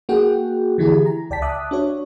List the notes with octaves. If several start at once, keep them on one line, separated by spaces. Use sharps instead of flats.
A#3 F#4 G#4 F#5 G5
D3 E3 E4 G4 G#4
A#5
C#2 D5 G5 A5 B6
E5 A5 D6 D#6 F#6
D4 F#4 C#5